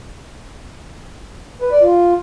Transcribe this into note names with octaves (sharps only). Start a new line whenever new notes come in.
B4
D5
F4